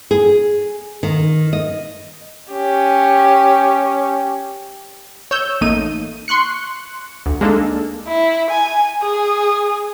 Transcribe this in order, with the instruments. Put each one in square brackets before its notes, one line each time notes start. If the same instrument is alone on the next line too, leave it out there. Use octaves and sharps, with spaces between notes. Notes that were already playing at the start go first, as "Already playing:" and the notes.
[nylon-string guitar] G#4
D#3
D#5
[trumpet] C#4 [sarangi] G4
[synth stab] C#5 E6 G6
A1 A3 A#3 D#4 D#7
C6 C#6 F#6 C#7
D2
G#3 A#3 D4 D#4 A4
[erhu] E4
G#5
G#4